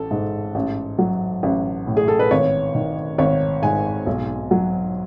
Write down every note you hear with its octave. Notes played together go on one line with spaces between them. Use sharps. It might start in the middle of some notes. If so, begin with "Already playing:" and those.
Already playing: A1 A4
G#2
A1
F#3
A1
A2
G#4
A4
B4
G#1 C#5
D#3
G#1 C#5
G#2 G#5
B1
F#3